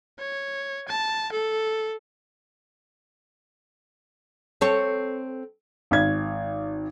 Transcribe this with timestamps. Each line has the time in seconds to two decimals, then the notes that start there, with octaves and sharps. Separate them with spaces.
0.19 C#5
0.88 A5
1.32 A4
4.61 C4 A4 C#5
5.91 G#1 G#6